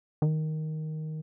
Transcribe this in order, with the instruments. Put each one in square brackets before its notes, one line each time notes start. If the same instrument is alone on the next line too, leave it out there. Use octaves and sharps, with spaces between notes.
[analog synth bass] D#3